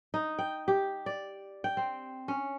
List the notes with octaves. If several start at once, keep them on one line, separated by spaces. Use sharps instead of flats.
D#4
G5
G4
D5
G5
C4
C#4